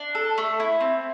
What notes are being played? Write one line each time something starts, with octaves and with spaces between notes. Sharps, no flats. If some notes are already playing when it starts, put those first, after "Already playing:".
Already playing: D4
A4
A3
E4
C4